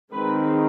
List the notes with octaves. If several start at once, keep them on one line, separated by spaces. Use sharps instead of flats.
D#3 G#3 C4 B4